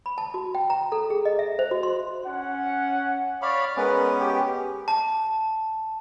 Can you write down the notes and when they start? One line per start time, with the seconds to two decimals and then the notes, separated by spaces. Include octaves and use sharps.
0.06 B5
0.18 A5
0.34 F#4
0.55 G5
0.70 A#5
0.92 A4
1.10 G#4
1.25 D#5
1.39 E5
1.59 C5
1.71 F#4
1.83 C6
2.26 C#4 F#5
3.42 C#5 D5 F5 B5 D6
3.77 G#3 B3 C#4 A#4 B4 F#5
4.20 G4
4.88 A5